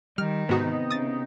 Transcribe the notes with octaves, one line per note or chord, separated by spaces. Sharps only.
D#3 G3 F6
G#2 C3 B3 D#4 F#4
C#3 D#6 A6